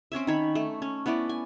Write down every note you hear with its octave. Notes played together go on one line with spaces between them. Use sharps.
C4 C#4 C#5 E5
D#3 C#5 B5
A3
C#4
B3 C#4 E4 D5
G#5